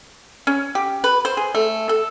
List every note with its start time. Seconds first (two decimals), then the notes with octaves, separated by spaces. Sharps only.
0.47 C#4
0.75 G4
1.04 B4
1.25 C5
1.37 G#4
1.55 A3
1.89 A4